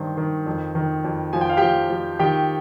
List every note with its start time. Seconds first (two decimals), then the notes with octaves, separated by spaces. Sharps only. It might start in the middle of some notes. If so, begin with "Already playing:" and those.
Already playing: G2 D#3 C5
0.17 D#3
0.46 F2
0.75 D#3
1.04 F2
1.33 F3 G#5
1.41 G5
1.49 F5
1.57 F3 G4 G5
1.90 F3
2.19 D#3 G4 G5